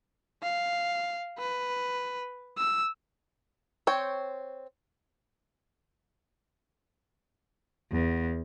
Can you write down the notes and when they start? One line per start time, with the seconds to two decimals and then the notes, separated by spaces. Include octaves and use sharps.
0.42 F5
1.39 B4
2.58 E6
3.87 C4 C#5 G5
7.92 E2